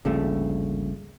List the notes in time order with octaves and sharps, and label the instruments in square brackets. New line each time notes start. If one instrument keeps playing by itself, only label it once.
[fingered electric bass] G#1 D2 A#3 [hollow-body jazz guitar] G2 F3 A3 [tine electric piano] C#3